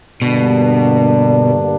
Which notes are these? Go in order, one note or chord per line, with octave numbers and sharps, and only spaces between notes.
G2 B2 D3 G3 A#3 D4